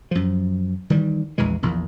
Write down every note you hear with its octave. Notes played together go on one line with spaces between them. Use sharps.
F#2 F3
D#3 E3 G3
A#1 E2 E3 G#3
A#1 E2 A#2